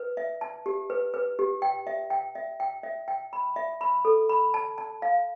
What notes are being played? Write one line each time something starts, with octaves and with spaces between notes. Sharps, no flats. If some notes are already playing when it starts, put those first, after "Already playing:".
Already playing: B4
E5
A5
G4
B4
B4
G4
G5
E5
G5
E5
G5
E5
G5
B5
E5
B5
A4
B5
A5
A5
F5